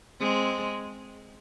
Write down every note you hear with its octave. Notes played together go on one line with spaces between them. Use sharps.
G#3 C4